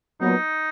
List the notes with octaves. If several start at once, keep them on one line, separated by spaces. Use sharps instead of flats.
A#2 F#3 B3 D#4